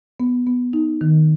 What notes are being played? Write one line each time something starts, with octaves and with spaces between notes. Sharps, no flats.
B3
B3
D#4
D#3